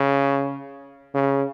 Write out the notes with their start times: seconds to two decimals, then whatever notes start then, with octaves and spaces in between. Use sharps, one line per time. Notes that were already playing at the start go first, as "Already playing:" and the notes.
Already playing: C#3
1.14 C#3